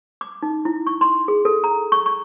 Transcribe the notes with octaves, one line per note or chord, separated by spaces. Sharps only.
D6
D#4
E4
C#6
C6
G#4
A4
A#5
C#6
C#6